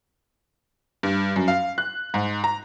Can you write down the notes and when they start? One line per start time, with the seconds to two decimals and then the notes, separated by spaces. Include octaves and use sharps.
1.03 G2
1.36 F#2
1.48 F5
1.78 F#6
2.14 G#2
2.44 A#5